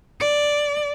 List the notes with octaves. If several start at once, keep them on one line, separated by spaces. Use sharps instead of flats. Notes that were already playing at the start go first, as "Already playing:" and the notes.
D5